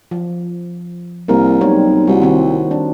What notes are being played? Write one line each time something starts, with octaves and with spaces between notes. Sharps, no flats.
F3
C2 A#3 A#4
B1 G3 C4 C#5
C2 F#4
D#3 C4
D4